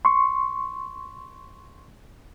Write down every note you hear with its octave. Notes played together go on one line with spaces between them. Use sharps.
C6 C#6